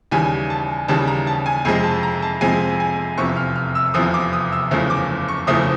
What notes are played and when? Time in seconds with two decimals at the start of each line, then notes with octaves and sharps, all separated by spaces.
0.11 D#2 C#3 E3 G3 G#5
0.50 A5
0.88 D#2 C#3 E3 G3 A5
1.07 A#5
1.27 A5
1.46 G#5
1.65 F2 C3 F3 G#3 G#5
1.84 A5
2.03 A#5
2.22 A5
2.41 F2 C3 F3 G#3 G#5
2.80 G#5
3.17 F1 E2 C3 F3 C#6
3.37 F6
3.56 F6
3.75 E6
3.94 F1 E2 C3 F3 D#6
4.14 D6
4.33 D#6
4.52 E6
4.71 F#1 E2 C#3 F3 A3
4.90 D6
5.28 C#6
5.47 F#1 E2 C#3 F3 A3 D#6